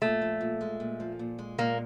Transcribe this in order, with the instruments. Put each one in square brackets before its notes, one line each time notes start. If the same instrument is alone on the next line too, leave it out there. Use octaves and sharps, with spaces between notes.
[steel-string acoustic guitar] A#2 [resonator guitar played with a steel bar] A3
[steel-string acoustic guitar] F3
A#2
G#3
A#2
F3
A#2
G#3
[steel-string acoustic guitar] A#2 [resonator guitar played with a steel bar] A#3